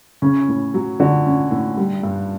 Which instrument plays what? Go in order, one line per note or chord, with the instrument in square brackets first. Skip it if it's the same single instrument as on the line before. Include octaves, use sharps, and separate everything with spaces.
[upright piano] C#3 [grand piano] C#4
[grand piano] A2
F#3
[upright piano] D3 [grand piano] F#4
[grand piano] C#4
A2
G3
G2